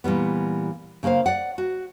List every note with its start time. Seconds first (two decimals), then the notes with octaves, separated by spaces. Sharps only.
0.04 A#2 E3 G3 B3
1.03 C#3 A#3 A#4 C5 F5
1.26 D5 F#5
1.58 F#4